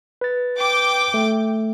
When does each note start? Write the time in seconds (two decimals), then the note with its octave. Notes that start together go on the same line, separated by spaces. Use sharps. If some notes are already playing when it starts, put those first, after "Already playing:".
0.21 B4 A6
0.58 G5 D6
1.14 A3